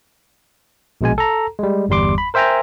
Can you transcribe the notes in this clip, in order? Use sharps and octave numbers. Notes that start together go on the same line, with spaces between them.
A#1 B2 G#3 G#5
A4 A#5
G3 G#3
G1 E2 G3 C6 D6
B5
A#4 C5 E5 G5 G#5 A#5